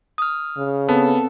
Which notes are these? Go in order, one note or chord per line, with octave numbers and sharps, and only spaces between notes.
D#6 F6
C#3
B3 C4 A4